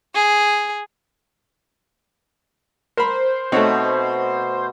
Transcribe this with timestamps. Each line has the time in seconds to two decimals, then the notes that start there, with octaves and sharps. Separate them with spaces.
0.15 G#4
2.97 A#4 C5 B5
3.52 B2 A3 C4 D#4 F#4 C#5 F#5